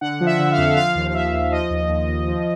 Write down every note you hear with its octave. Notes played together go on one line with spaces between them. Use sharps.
D3 F#5
F3
E5
D3
F5
F2
F3 F5
D#2
F5
F3 E5
D#2
F3 D#5
D#2
D#2
D#2
F3